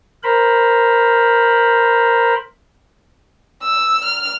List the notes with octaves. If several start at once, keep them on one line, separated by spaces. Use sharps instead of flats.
A#4 C5 B5
E6
F6